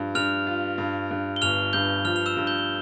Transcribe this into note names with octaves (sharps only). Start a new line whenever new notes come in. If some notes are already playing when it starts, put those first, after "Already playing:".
Already playing: G2 F3
G2 F6 F7
F4
G2
G2
G7
G1 F6 F7
G2 G6 G7
F3 F6 F7
F7
E6 E7
G2
G6 G7
G7